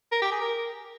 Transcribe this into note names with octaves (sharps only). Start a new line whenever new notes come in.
A#4
G4
G#4
A#4